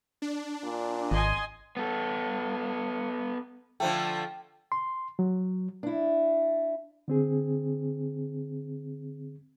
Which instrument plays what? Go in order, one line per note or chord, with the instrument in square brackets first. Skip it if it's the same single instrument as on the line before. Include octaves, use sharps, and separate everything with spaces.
[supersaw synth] D4
[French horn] A#2
[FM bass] G#1 [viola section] D#5 G#5 C6
[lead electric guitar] B3 A4
[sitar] D3 F3 A3 [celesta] G5
[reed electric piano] C6
F#3
[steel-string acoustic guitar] D4 E4
[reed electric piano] D3 C4 G#4